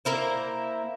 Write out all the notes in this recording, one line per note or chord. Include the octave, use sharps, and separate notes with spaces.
A#3 E4 C5